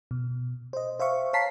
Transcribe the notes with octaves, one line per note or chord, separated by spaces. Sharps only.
B2
C5 D#5
C5 E5 F5 C#6
C#5 F5 A5 A#5 B6 C7